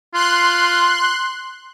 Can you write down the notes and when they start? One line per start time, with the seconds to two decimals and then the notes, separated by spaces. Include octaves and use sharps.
0.14 F4 C6 F#6